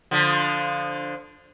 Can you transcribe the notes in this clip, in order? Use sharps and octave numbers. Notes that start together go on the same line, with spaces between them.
D3 F3